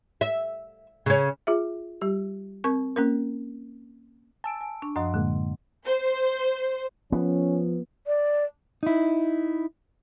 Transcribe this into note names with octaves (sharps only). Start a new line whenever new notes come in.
E5
C#3 C#4
F4 G#4 E5
G3 G4
C4 A#4 C#6
A#3 C#4 A#4
G#5 A5 E6 D7
G#5
D4 C#6
F#2 F3 D#5 F#5 C6
A2 D3 G#3 A#3
C5
F3 B3 C#4
D5
D#4 E4